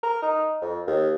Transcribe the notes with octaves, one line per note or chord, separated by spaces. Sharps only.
A#4
D#4
F2
D#2